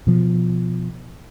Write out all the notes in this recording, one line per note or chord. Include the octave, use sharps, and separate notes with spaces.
B2 F3